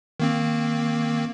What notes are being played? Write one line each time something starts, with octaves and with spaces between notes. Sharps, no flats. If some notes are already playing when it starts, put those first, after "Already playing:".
D#3 A#3 C4